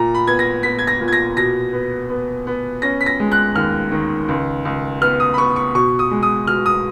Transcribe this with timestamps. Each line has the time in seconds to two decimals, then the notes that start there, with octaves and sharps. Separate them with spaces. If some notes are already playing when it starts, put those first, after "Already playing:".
Already playing: A#2 A#5
0.14 B5
0.27 B3 G#6
0.39 A#6
0.63 B3 B6
0.79 G#6
0.87 A#6
1.01 A#2
1.08 G#6
1.13 A#6
1.37 B2 A#6
1.73 B3
2.09 B3
2.47 B3
2.82 C#4 A#6
3.01 B6
3.06 A#6
3.20 G#3
3.32 F#6
3.55 D#2 F6
3.91 D#3
4.28 C#2
4.65 C#2
5.01 B3 F6
5.20 D#6
5.34 B5
5.38 B3 C#6
5.56 C#6
5.75 B2 C#6
5.99 D#6
6.11 G#3
6.23 D#6
6.47 B2 F6
6.66 D#6